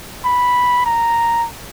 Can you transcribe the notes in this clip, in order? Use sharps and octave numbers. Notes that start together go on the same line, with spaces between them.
B5
A#5